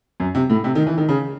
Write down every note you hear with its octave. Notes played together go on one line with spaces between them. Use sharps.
F#2
C3
A2
C3
D#3
E3
D#3
C#3